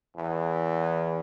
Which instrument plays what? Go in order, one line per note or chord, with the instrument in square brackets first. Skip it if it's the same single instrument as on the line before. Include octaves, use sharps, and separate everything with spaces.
[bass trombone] E2